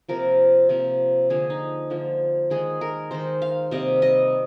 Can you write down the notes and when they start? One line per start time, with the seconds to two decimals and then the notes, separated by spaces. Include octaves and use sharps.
0.09 C3 F3 A#3 A#4
0.69 C3 F3 A#3
1.30 D3 F3 A#3 G#4
1.50 D#4
1.90 D3 F3 A#3
2.50 D#3 G#3 G#4
2.81 A#4
3.11 D#3 G#3 C5
3.42 F5
3.71 C3 G3 A#3 D#5
4.02 D#5